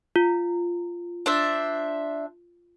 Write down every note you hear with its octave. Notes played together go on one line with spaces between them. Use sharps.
F4
D4 C5 E5